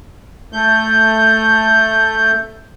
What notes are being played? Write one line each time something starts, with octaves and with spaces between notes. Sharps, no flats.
A3 G6